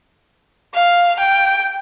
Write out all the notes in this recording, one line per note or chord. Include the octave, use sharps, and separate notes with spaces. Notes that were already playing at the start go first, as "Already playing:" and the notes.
F5
G5